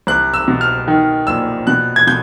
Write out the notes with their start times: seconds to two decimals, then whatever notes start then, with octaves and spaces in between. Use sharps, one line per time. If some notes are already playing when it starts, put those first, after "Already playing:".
0.07 C2 F#6
0.34 E6
0.48 B2
0.61 F6
0.88 D#3
1.27 A#1 E6
1.67 B2 F#6
1.96 G#6
2.07 B2 G6